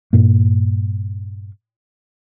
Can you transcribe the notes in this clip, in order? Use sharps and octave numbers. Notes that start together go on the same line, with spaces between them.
G2 A#2 A#3